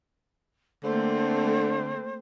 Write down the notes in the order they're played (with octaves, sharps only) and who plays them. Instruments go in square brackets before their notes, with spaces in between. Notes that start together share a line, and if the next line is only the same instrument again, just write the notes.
[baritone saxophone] D3 [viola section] A3 A#3 C4 [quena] C5